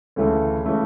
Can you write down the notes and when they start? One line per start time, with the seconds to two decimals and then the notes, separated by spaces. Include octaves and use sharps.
0.16 D2 C#3 E3 A3
0.66 C#3 E3 A3